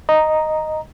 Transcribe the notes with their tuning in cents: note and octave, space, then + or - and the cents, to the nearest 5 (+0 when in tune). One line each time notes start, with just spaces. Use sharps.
D#5 +0 A#5 +0